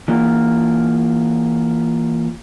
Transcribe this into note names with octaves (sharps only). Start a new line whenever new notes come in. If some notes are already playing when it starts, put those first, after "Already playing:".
E3 A#3 F4